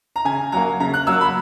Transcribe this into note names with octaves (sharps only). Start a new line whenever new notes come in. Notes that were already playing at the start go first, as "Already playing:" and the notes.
A#5
C#3 G#5
F#3 A#3 A#5
C#3 A#5
F#6
F#3 A#3 E6
B5